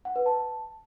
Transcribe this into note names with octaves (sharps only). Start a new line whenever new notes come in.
F#5
B4
A5